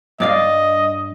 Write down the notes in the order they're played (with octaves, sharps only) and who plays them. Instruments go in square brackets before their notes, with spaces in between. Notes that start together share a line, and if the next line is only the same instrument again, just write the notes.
[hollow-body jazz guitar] G2 D5 F5 [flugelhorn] D#5